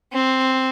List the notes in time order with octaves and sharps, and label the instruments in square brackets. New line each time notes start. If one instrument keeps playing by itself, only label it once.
[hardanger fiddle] C4